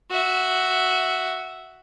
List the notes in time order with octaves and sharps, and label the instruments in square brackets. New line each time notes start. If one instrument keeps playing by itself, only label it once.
[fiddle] F#4 E5